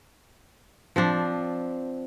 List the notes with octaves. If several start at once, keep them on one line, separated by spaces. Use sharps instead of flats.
F3 C4 D4